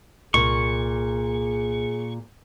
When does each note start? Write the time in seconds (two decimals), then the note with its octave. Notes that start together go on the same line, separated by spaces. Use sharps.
0.34 C2 A#2 G#4 C#6